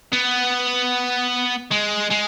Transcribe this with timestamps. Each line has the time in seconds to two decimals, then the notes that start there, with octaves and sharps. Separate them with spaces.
0.13 B3
1.72 G#3
2.11 G#3